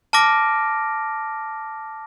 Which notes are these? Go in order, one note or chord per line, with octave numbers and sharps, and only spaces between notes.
A5 D6 F6 A#6 D7